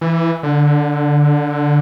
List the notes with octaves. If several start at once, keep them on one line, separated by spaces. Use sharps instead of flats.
E3
D3